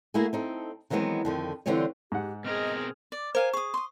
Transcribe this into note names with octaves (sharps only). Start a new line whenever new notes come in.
A3 A#3 E4 F#4 G#4
C4 D#4 A4
D#3 E3 F#3 G#3 B3 C4
F2 D3 D#3
D3 E3 G3 C4 F4 C#5
G#2 G4 F#5
B2 C4 G#4 A#4 D#5 F6
D5
A#4 C5 F5 G#5
G#4 C#6 D#6
C6 D#6